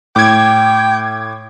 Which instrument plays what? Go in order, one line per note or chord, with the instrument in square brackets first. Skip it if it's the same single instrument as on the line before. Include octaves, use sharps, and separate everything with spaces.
[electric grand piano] A2 [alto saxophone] G5 [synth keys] D6 G#6